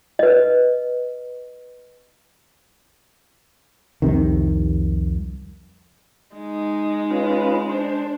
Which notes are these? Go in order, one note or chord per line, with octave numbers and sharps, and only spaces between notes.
B4 D#5
C2 F2 C3 D#3
G#3 D#4
C#4 F4 B4
D4 C5